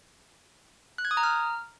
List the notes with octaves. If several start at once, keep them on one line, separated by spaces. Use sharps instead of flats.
F#6
G#6
D#6
A#5
F6